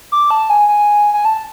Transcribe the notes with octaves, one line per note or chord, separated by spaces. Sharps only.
D6
A5
G#5
G#5
G#5
A5